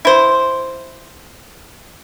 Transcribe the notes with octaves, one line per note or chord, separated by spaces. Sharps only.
E4 C5